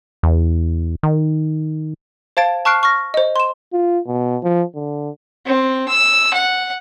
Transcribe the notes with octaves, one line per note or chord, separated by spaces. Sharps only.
E2
D#3
C5 F5 A5 G#6 A6 D7
A5 C#6 F6 F#6 C7 D7
C#6 F6 A#6
C5 D#5
C6 E7
F4
B2
F3
D3
C4
E6
F#5